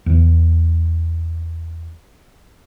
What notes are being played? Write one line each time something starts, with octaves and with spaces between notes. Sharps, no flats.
E2 E3